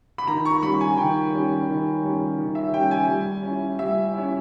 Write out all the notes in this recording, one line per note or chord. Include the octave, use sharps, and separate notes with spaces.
B5
D#3 A#5
C#6
G3 C#4 B5
G#5
D#3 G5
G3 C#4
D#3
G3 C#4
D#3
E5
G3 C#4 G5
G#5
G3
C#4 E4
G3 E5
C#4 E4